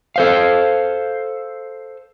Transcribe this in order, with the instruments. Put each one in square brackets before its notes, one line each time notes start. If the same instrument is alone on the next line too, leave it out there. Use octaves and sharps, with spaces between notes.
[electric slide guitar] A4 C5 F5